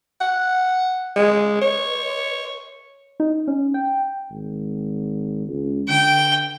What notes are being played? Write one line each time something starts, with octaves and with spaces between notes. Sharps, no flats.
F#5
G#3
C#5
D#4
C#4
G5
G#1
C#2
D3 G5